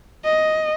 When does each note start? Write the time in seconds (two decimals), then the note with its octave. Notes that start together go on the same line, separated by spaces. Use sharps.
0.25 D#5